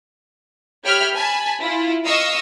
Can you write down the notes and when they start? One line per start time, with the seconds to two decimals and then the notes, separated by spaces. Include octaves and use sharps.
0.84 G4 C#5 E5 G5 B5 F6
1.15 G#5 A5 B5
1.60 E4 F4
2.06 D#5 F5 C#6 D#6 E6